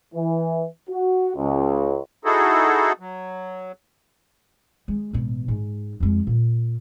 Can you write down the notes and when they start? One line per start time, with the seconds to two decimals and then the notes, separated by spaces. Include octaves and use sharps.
0.15 E3
0.90 F#4
1.37 C#2
2.25 D#4 E4 F#4 G#4 A4
3.00 F#3
4.88 G#3
5.13 A1 B2
5.48 G#2
6.00 F2 G#3
6.27 A#2